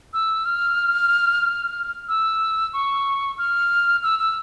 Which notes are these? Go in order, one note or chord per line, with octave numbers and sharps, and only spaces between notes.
E6
F6
E6
C#6
F6
E6
E6